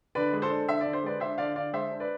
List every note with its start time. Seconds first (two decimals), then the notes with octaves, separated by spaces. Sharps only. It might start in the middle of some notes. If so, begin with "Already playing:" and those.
0.15 D3 B4 D5
0.33 G#3
0.42 A4 C5
0.50 D4
0.68 D3 E5
0.81 D3 D5
0.93 C5
1.03 G#3 B4 D5
1.20 D4 C5 E5
1.38 D3 D5 F5
1.56 D3 D5 F5
1.73 G#3 C5 E5
1.91 D4
2.00 B4 D5